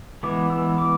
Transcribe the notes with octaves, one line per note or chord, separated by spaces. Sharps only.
E3 G#3 B3 D6
E6
D6